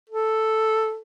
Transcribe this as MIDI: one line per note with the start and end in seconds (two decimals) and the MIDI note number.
0.09 0.99 69